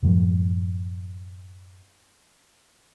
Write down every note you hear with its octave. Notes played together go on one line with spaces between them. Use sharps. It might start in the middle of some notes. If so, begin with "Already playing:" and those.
F#2 A2 F3 F#3